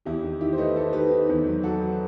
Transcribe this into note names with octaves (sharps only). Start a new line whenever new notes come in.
E2 E4 G4
D#3
D#3 E4 G4
C5
A3 B4 D#5
D#3 A4 C5
A3 G4 B4
D#3
E2
F#3
F#3 F#4 A4
F#3